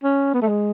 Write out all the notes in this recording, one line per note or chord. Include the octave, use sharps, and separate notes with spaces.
C#4
B3
A3
G#3